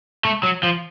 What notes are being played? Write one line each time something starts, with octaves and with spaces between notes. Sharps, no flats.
A3
F#3
F3